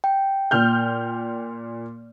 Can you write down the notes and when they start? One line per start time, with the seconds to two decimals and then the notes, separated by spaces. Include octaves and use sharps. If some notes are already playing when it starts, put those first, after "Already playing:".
0.04 G5
0.51 A#2 F6 G6